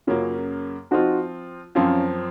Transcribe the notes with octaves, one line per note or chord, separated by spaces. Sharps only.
F#2 C#3 F#3 A#3 C#4 F4
F3 C4 D#4 F4 F#4
F#2 F3 C4 C#4 F4